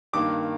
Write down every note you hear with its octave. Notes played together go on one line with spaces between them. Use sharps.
G2 D#3 A#3 D6